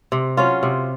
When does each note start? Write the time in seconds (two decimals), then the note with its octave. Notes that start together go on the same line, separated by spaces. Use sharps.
0.12 C3
0.37 F#3 C#4 F4
0.63 C3